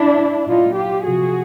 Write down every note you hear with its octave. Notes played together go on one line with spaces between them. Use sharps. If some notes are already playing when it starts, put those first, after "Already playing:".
Already playing: D4 E4
A#2 F#3 D#4 F4
F4 G4
C3 F3 F#4 G#4